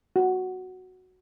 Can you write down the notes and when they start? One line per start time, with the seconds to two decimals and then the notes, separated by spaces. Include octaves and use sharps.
0.16 F#4